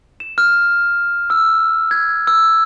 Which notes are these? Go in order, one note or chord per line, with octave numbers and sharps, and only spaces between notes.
E7
F6
E6
G#6
E6